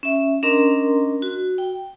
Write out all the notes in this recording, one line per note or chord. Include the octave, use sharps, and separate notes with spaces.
C#4 E5
C#4 D4 A#4 D#5 A#5 C6
F#4
G5